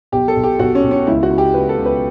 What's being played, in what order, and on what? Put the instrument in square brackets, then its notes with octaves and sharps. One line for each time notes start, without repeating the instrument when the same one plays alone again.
[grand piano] B1 G4
A4
B1
G4
B1 F#4
C#4
B1
C#4
C#2 E4
F#4
C#2
G4
C#2 B4
A4
C#2
B4